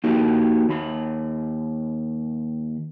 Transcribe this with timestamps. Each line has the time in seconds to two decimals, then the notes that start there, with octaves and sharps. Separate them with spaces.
0.04 A#3 D#4 F#4 G4
0.69 D#2 B5